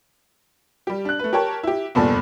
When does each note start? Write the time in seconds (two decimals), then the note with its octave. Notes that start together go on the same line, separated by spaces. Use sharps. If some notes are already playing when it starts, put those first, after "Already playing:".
0.87 G3 G4
1.05 D4 F#6
1.19 A3 B4
1.33 G4 A#4 C#5 G5 A5
1.63 E4 G4
1.95 F1 E2 G2 A#2 A4 D5